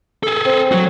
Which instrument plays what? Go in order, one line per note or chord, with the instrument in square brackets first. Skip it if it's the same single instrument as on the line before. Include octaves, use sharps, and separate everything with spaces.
[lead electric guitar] G#4 A4
[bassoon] C4
[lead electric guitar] F#3 F#4